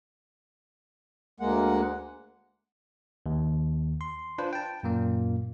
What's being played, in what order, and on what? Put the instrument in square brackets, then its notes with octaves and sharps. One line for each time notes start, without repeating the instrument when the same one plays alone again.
[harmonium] D2 G#3 A#3 F#5
[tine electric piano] D#2
C6
D4 F4 B4 C5
G5 A5
F#2 A#2 A#3